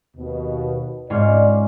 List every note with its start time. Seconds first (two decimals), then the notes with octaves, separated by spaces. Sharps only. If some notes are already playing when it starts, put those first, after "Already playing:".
0.17 D#2 B2
1.10 G#2 C#4 F4 D5